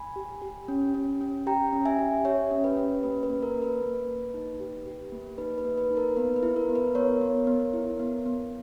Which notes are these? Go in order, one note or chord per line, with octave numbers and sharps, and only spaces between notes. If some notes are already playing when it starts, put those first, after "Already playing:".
Already playing: G#5 B5
G4
G4
C#4
C#4
C#4
G4 G5 A#5
C#4
E5 G#5
G4
G4 C#5 E5
C#4
B4
C#4
A#3 B4
B4
A#3
A#4
A#3
B4
A#3
A#3
D#4
G4
G4
A#3
D#4 B4
B4
A#3
B4
D#4
A#4
B3 B4
B4
E4
A#4
B3
B4
B3 A#4 C#5
B3
B3
E4
B3
B3